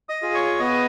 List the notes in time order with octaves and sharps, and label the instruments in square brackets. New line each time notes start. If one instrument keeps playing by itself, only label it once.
[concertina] D#5 D#6
F4 G#4
C#5 C#6
B3 D#5 D#6